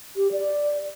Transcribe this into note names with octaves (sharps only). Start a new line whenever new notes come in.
G4
D5